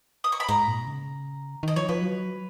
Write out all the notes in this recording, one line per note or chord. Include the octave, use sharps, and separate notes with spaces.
D#6
C#6
B5
G#2 A#5
A#2
B2
C#3
D#3 D#5
F3 C#5
F3 B4
F#3